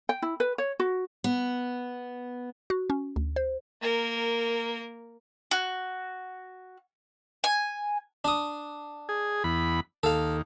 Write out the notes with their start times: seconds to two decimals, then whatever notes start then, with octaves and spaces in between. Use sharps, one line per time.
0.09 G5
0.22 E4
0.40 B4
0.58 C#5
0.80 F#4
1.24 B3
2.70 F#4
2.90 C#4
3.16 D2
3.36 C5
3.81 A#3 A#4
5.51 F#4
7.44 G#5
8.25 D4 D#6
9.09 G#4
9.44 E2 B5
10.03 D#2 A4 F5